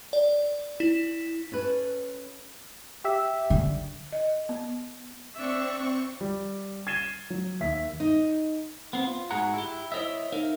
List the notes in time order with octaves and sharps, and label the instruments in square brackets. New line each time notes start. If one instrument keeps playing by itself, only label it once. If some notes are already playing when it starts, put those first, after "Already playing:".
[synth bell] D5
E4
[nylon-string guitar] C#4 A4 B4
[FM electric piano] G4 E5
[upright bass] D3
[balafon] D#5
B3
[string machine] C4 C#6 [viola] D4 E5
[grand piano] G3
G#6 A6 C7 D#7 E7 G7
F#3
D#2 E5 B6
[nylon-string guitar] D#4
[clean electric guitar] B3 C4
F4
G#2 F#4 G#4 F#5 A#5
E4 G4
E4 C5 C#5 D#5 E5
D#4 A#4 E5 F5